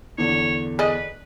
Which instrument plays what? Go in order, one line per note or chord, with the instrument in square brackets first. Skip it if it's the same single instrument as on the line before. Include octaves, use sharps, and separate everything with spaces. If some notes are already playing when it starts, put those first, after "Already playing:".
[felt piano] E2 D3 [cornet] C#5
[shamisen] G#4 D5 D#5 [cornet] B4